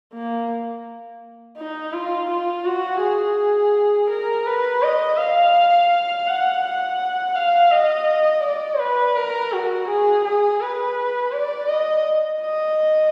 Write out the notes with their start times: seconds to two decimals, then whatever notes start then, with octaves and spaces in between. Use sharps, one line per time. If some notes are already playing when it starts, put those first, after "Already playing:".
0.13 A#3
1.57 D#4
1.93 F4
2.30 F4
2.65 F#4
3.01 G#4
4.10 A#4
4.47 B4
4.82 D#5
5.18 F5
6.27 F#5
6.64 F#5
7.35 F5
7.72 D#5
8.43 D5
8.79 B4
9.16 A#4
9.52 F#4
9.88 G#4
10.24 G#4
10.61 B4
11.32 D5
11.69 D#5
12.41 D#5